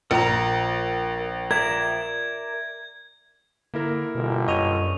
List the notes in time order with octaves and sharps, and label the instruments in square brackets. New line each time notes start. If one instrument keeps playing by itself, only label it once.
[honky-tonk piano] A#1 [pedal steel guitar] A#4 A#5
[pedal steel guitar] A#4 D5 E5 [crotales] G#6
[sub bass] D3 [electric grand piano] A#3 E4 A#4
[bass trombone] G1 [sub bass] B2
[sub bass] F#2 [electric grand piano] C#5 D#5 [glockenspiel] C#6 D#7 F7